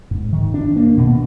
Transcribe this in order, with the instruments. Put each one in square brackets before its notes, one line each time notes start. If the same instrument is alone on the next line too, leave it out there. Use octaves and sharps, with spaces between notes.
[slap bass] G#2
D#3
D4
A#3
B2